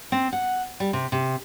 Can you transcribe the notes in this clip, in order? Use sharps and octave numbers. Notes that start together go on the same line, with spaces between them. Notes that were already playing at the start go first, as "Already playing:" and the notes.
C4
F#5
G3
C3
C3